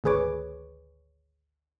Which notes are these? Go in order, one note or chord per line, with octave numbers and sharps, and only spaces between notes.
G#1 D2 G#4 B4 C#5 D6